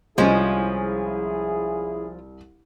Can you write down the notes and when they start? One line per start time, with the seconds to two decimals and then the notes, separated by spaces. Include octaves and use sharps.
0.18 C2 F3 G#3 C#4 E4 G#4